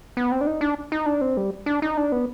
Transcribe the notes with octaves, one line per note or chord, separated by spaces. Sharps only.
B3
C4
D4
D#4
D4
D#4
D4
C4
G3
D4
D#4
D4
B3